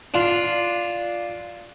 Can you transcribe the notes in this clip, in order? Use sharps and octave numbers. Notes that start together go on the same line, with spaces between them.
D4 F4